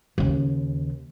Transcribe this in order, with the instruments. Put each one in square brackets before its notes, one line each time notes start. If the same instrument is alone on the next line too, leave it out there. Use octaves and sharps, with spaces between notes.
[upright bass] D#2 C#3